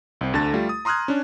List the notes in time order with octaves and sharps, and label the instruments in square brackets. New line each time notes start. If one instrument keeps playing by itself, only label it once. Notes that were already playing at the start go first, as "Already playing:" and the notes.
[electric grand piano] C2 C4
D2 D3 A5 A6
G3 A3 F4 G4
D#6
A#5 C6 D#6 F6 F#6 G#6
C#4 D4